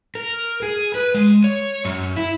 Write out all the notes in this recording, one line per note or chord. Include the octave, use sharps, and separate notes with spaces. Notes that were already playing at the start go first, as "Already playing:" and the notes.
A#4
G#4
B4
G#3
C#5
F#2
E4